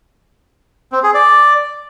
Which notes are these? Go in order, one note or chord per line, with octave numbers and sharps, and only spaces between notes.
C4
G#4
D5